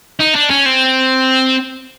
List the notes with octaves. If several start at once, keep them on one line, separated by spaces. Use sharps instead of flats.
D#4
D4
C#4
C4